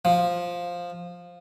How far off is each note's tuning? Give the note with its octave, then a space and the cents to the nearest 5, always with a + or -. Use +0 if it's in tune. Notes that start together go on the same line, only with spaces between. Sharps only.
F3 +5